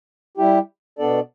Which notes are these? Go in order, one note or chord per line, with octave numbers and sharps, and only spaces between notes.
G3 E4 G4
B2 B3 D4 A4 D5